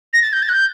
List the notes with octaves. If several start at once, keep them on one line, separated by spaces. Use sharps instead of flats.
A#6
A6
G6
A6
F#6
G6